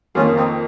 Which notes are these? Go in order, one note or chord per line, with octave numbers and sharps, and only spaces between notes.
F2 D#3 A#3 C#4 F4
C4 D#4